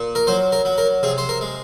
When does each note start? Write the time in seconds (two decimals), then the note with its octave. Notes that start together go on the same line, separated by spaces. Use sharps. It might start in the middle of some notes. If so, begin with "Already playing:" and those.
Already playing: A#2
0.15 A#4
0.27 F#3 C5
0.52 A#4
0.65 F#3
0.78 A#4
1.03 C3 G#4
1.18 C5
1.29 A#4
1.41 G#3